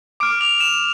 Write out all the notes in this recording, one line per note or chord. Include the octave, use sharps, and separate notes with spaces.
D6 F6 D7
F7
E7